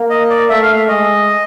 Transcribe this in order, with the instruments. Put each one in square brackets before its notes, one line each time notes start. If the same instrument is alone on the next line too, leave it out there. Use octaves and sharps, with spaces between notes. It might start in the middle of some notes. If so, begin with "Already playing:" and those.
Already playing: [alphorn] A#3
[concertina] D#5
D5
[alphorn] A3 [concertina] E5
[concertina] F5
E5
[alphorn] G#3 [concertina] D#5